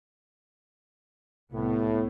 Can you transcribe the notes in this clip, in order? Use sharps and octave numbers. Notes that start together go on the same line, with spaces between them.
C2 A2 B3